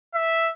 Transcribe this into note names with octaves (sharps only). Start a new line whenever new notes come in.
E5